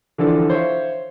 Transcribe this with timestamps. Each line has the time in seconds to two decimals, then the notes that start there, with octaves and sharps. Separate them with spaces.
0.18 D3 E3 F3 D4 A4
0.50 C5 C#5 E5 F5